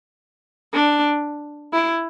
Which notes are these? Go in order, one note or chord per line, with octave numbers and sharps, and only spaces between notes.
D4
E4